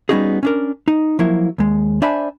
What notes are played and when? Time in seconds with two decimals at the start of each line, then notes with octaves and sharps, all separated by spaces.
0.09 G3 B3 C#4 D#4 F#4 G#4
0.43 C#4 D4 A#4
0.88 D#4
1.19 F3 F#3 A#3 E4
1.58 D#2 G#3
2.02 D4 C5 D5 E5 G#5 B5